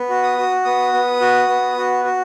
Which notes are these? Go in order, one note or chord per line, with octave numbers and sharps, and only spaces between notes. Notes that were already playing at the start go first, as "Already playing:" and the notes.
Already playing: B3
F#4
D#6
F#4
B3 D#6
B3
F#4
B3
F#4
F#4